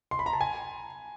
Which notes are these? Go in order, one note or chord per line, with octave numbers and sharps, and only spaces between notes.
C6
B5
A#5
A5
G#5